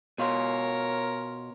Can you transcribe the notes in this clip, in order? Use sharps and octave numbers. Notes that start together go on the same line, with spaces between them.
B2 F4 A#4 C#5